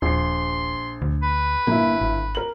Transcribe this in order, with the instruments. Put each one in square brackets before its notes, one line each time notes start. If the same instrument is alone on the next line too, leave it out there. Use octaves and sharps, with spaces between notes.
[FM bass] D#1 [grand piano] A#1 C7 [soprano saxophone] C6
[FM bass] D2
[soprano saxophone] B4
[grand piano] G1 E4 [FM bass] A#3
[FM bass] G#1
[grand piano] A#4 F#7